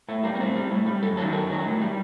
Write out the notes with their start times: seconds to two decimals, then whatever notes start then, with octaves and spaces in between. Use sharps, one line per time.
0.08 A2 A3
0.23 G3 A#3
0.35 A#3
0.40 A2 C4
0.55 G3
0.71 A2
0.86 G3
1.02 F#2 A4
1.17 D#3 F#3 A4
1.33 F#2 A#4
1.49 D#3 F#3
1.65 A2
1.81 G3